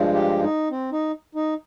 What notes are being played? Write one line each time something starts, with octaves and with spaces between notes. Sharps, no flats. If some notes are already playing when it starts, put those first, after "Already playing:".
Already playing: G2 F3 G#3
G4
D#4
C4
D#4
D#4